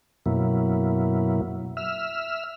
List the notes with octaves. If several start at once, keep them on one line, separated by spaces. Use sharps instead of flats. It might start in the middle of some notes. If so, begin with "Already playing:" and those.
F#2 B2 F#3 A#3 E4
E5 E6 F6